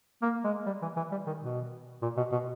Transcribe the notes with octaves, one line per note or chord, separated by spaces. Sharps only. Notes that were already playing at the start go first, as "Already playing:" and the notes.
A#3
G#3
G3
E3
E3
G3
D#3
B2
A#2
B2
B2